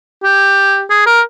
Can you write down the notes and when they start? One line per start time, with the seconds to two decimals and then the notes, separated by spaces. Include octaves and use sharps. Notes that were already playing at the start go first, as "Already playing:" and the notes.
0.24 G4
0.90 G#4
1.06 A#4